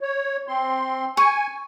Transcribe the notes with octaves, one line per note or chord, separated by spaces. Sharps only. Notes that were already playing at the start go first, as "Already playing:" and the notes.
C#5
C4 C6
G#5 C#6